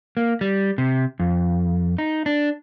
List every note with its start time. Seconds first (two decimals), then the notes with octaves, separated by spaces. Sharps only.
0.17 A#3
0.41 G3
0.78 C3
1.20 F2
1.98 D#4
2.26 D4